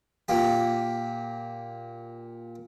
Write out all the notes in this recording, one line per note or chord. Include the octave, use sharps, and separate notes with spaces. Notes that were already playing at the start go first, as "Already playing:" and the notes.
A#2 A#3 G4